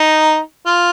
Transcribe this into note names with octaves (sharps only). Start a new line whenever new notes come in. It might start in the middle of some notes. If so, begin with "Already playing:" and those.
Already playing: D#4
F4